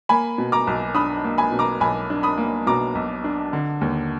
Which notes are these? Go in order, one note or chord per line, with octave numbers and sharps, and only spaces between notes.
A#3 G#5 B5
B2
A#5 D6
B1
D4 B5 D#6
A#3
G#5 B5
B2
A#5 D6
B1 G#5 B5
D4
B5 D#6
A#3
B2 A#5 D6
B1
D4
D3
D#2